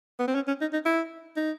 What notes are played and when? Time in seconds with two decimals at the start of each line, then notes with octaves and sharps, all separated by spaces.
0.20 B3
0.28 C4
0.35 C#4
0.48 C#4
0.61 D#4
0.73 D#4
0.86 E4
1.36 D#4